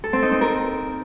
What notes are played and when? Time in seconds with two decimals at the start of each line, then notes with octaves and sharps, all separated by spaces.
0.04 A4
0.13 C4
0.22 D#4
0.32 C4
0.41 A#4